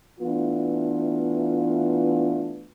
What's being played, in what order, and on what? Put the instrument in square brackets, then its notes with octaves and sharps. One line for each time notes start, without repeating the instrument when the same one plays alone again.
[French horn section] E3 A3 B3 D4 F4